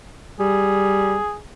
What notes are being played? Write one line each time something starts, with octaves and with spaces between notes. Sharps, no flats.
G3 G#4